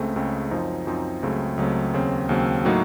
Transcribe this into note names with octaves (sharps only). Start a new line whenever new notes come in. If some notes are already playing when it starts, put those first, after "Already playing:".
Already playing: C#2 C#3 A3 C4
C#2 C#3 A3 C4
F#2 F3 C4 D#4
F#2 F3 C4 D#4
C#2 C#3 F#3 A3 C4
C#2 C#3 F#3 A3 C4
D#2 C#3 F#3 C4
D#2 C#3 F#3 C4
A2 F#3 A#3 D#4 F#4